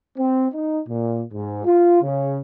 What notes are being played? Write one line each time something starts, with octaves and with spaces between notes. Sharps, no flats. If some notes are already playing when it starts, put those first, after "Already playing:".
C4
D#4
A#2
G#2
F4
C#3